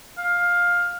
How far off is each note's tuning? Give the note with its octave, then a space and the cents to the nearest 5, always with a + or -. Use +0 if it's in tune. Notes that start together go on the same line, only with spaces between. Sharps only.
F5 +15